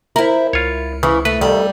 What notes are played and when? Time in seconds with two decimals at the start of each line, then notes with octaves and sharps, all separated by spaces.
0.16 E4 A#4 C5 E5
0.53 C#2 F4 C#5
1.03 C#3 E3
1.25 A3 B4
1.41 C2 F2 D#3 G3 A4